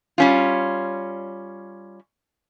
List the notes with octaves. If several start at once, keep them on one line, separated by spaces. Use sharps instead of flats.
G3 C#4 F4